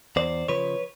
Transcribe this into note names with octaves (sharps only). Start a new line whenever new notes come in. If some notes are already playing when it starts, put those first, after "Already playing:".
E2 C5 D5
C#3 F3 B4 C#5